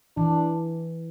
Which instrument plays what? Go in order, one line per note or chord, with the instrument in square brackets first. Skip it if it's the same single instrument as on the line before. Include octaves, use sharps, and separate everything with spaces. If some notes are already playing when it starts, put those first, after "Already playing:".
[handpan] E3 [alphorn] D4